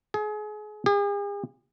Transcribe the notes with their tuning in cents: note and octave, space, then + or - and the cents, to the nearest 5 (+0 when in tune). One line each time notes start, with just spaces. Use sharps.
G#4 +30
G#4 -45